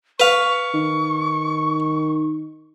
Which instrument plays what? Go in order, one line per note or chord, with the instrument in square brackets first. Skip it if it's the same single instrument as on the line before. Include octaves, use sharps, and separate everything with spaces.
[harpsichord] B4 F5 [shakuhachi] C#6
[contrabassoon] D#3